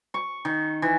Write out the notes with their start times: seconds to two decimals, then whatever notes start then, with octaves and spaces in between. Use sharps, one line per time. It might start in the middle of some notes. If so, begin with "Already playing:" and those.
0.14 C#6
0.45 D#3
0.82 E3